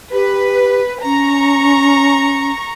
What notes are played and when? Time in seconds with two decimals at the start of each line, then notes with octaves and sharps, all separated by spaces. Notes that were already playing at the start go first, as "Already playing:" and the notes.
0.13 G4 B4
1.04 C#4 A#5 C#6